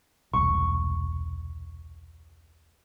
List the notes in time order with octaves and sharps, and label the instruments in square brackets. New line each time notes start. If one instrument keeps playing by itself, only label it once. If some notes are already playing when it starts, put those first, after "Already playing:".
[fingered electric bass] E1 C2 [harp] C#6